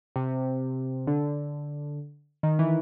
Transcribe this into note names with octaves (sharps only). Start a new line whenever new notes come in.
C3
D3
D#3
E3